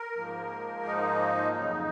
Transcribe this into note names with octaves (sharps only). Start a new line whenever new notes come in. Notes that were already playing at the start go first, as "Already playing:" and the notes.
Already playing: A#4
G#2 F3 A#3
D#4
F2 C#3 F#3